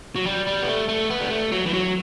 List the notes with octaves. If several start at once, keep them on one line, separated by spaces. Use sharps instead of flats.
F#3
G3
G3
B3
A3
A3
B3
G3
A3
F#3
E3
F#3